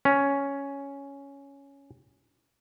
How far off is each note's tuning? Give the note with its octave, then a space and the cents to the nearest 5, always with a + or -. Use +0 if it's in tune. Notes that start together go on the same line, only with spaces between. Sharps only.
C#4 +5